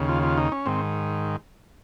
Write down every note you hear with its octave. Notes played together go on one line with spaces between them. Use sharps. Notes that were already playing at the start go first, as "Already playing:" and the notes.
Already playing: D#2 C#3
F4
F4
D#4
C#4
G#2 D#3 C4